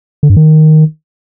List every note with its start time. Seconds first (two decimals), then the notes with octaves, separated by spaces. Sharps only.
0.23 D3
0.30 G2
0.37 D#3